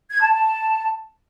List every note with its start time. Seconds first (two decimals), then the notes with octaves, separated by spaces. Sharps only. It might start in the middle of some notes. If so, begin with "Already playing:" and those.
0.10 G#6
0.21 A5
0.32 A5